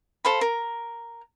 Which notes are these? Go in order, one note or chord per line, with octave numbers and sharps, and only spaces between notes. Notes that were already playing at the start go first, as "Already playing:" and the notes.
A4 C5 F5 B5
A#4